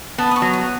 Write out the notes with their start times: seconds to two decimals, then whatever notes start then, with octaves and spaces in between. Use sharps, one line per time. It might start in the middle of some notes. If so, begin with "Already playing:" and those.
0.18 B3 A5
0.31 D#6
0.36 C#6
0.42 F#3
0.53 D#6